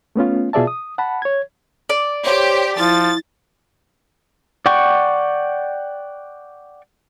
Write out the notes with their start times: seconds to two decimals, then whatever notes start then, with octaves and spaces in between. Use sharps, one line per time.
0.16 A3 B3 C#4 F4
0.53 B2 F4 G#4 D5 E5 A5
0.67 D#6
0.98 F#5 A5 B5
1.22 C#5 G#6
1.90 D5
2.26 G4 C5 C#5
2.78 F3 E4 A6
4.66 D5 F#5 G5 C#6